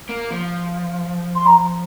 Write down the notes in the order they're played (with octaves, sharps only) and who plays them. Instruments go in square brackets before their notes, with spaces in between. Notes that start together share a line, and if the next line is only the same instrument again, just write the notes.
[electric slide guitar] A#3
F3
[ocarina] C6
A#5